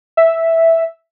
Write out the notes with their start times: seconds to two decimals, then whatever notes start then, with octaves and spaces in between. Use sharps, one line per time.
0.17 E5